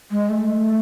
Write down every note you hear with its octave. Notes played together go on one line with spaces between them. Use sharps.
G#3
A3